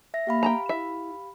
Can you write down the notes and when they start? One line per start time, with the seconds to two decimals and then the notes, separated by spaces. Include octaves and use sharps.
0.14 E5 A#6
0.27 A#3 G4 F5 B5
0.43 G5 A5 A#5
0.69 E4 E5